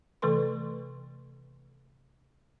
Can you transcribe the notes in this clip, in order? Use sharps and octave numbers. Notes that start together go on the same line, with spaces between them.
C3 E3 A3 A4 B4 C6